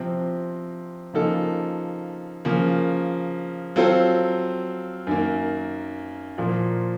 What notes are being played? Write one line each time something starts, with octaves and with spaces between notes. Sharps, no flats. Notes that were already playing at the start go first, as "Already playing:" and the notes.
Already playing: C3 F3 C4
C#3 F3 A#3 D#4 A4
C#3 F3 A#3
F#3 C4 F4 A4 C5
F#2 D#3 A#3
A#2 F3 A#3